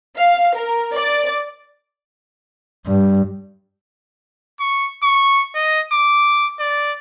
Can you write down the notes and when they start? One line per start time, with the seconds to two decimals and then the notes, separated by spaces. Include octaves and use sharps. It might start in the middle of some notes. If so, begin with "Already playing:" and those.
0.17 F5
0.56 A#4
0.95 D5
2.86 G2
4.60 C#6
5.03 C#6
5.55 D#5
5.93 D6
6.60 D5